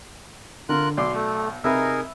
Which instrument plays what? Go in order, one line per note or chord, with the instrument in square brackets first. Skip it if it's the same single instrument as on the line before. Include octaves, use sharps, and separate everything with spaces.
[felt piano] D3 [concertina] F4 A#4 F#6
[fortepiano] B1 [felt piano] D5 D6 [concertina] C6
[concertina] A3
[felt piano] C3 [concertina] D#4 G#4 A#4 [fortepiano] B4 E5